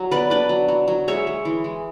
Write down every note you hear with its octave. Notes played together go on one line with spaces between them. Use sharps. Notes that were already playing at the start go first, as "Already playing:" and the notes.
Already playing: F#3
B3 B4 D5
D4 B4 D5
F#3
F#3
F#3
G#3 C#5 E5
G#3
E3
G#3